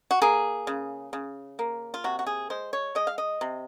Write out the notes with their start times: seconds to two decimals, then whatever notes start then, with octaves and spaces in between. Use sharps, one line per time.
0.11 F#4
0.22 A#3 G#4
0.67 C#3
1.13 C#3
1.59 A#3
1.94 F4
2.04 C3 F#4
2.19 F#4
2.26 G#4
2.50 G#3 C5
2.73 C#5
2.95 G#3 D#5
3.07 F5
3.18 D#5
3.41 C3